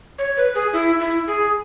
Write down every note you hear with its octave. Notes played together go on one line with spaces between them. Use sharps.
C#5
B4
G#4
E4
E4
G#4